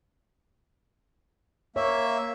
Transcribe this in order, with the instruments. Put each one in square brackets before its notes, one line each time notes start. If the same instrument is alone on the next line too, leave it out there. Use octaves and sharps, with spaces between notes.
[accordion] A#3 E5 [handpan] C#5